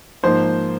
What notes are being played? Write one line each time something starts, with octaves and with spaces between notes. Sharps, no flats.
G#2 F3 A#3 C5